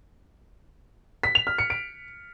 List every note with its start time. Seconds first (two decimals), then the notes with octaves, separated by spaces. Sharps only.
1.23 B6
1.35 F7
1.47 F6
1.58 C#7
1.70 D7